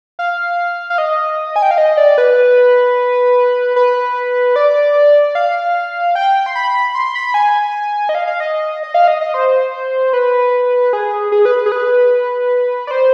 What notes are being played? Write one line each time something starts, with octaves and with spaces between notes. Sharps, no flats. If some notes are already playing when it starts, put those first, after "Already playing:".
F5
F5
D#5
G#5
G5
F5
D#5
D5
B4
B4
D5
F5
G5
C6
B5
C6
B5
G#5
D#5
F5
F5
D#5
D#5
F5
D#5
D#5
C5
B4
G#4
G#4
B4
G#4
B4
D5
C5